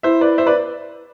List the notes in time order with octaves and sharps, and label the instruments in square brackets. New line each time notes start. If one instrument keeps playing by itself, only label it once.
[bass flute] E4 [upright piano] C5 E5
[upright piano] B4 D5
C5 E5
B4 D5